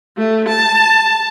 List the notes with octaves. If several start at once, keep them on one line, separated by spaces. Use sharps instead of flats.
A3
A5